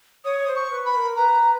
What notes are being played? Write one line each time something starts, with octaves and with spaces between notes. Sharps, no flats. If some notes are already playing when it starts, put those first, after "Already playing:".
C#5 D#6
D#6
C5
C#6
B4
B5
B4
A#4
B4 A#5